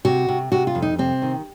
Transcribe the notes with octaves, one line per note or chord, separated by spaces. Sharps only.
C3 F#4
C3
C3 F#4
F4
F2
D#4
C3 C4
D#3